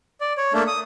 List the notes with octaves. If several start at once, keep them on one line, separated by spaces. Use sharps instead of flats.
D5
C#5
A3 A#3 D4
D#6